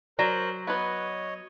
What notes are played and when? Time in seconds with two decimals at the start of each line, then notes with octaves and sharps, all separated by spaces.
0.19 F#3 A#4 C5 D5 A#5 F#6
0.67 B3 B4 C#5 D#5